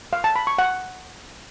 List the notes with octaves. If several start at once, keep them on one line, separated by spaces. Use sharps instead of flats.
F5
A5
B5
C#6
F#5